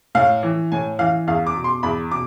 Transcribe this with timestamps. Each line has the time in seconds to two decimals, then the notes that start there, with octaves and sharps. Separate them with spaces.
0.15 A2 F5
0.43 E3
0.72 A2 G#5
0.99 E3 F5
1.27 E2 F5
1.47 D6
1.56 B2
1.64 C6
1.83 E2 B5
2.12 B2 D6